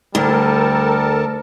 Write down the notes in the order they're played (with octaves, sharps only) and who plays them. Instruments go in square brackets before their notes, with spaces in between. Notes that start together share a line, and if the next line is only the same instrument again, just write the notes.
[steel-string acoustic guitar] D2 [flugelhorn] G3 [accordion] A4 A#4 A5